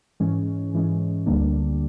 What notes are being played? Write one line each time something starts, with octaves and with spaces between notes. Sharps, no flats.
G#2 E3 G#3 C#4
G#2 E3 G#3 C#4
D2 D3 G3 A#3 D4